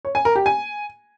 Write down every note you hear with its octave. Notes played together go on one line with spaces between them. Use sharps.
C#5
G#5
A#4
G4
G#5